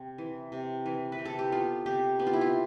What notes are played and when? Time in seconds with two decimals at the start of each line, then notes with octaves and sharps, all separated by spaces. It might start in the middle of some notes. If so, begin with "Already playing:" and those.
Already playing: C3
0.18 E3
0.52 C3
0.86 E3
1.12 B4
1.18 C3
1.25 A4
1.39 G4
1.52 B3 F4
1.86 C3 G4
2.19 B3 G4
2.27 F4
2.33 E4
2.41 F4